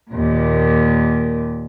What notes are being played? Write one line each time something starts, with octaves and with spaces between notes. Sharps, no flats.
D#2 A#2